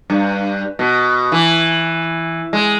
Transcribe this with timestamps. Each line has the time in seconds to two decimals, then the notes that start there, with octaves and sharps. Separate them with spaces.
0.10 G2
0.79 B2
1.32 E3
2.53 G#3